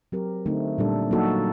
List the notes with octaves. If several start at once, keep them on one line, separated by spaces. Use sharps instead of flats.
F#3 C4 G4 A#4
D3 A3 C4 D#4
A#2 G3 D4 A4
F#3 A#3 D#4 F#4 A4